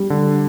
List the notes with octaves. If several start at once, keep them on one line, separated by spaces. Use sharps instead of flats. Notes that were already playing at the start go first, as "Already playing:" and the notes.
Already playing: G3
D3